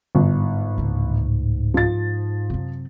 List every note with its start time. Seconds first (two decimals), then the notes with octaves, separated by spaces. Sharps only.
0.15 G1 G#2
0.78 C#2 A2
1.74 F3 A6
2.50 F#2 C3